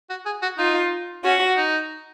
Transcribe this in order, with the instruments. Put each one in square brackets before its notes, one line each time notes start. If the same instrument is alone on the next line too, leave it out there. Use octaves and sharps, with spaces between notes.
[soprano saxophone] F#4
G#4
F#4
[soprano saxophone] D#4 [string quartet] F4
[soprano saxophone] C#4 [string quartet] F#4
[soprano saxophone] D#4